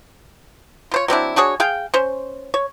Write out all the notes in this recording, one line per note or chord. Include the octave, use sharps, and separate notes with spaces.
F4 C5 C#5
F#3 C4 D4 E4
D4 F#4 G#4 C#5
G#4 F5 G5
C#4 C5
C#5